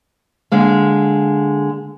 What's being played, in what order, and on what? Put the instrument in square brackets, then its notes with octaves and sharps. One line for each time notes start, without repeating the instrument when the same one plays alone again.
[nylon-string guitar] D3 G#3 A#3